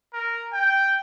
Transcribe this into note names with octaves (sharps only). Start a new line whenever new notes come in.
A#4
G5